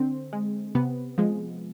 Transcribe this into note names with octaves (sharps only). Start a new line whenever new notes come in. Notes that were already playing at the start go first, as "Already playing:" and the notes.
Already playing: D3 C4
G#3
C3 B3
F3 G#3